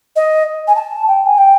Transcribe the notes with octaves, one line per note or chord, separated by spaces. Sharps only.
D#5
G#5
A5
G5
G#5
G5